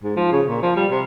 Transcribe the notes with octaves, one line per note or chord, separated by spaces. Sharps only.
G#2
F3
C#3
A#2
F3
G3
C3